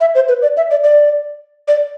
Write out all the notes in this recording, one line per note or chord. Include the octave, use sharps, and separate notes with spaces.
E5
C5
B4
D5
E5
D5
D5
D5